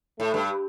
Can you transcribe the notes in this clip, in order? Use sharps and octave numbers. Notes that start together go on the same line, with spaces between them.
A2 A3
G2